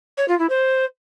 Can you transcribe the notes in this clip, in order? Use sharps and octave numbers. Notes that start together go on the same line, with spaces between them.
C#5
F4
E4
C5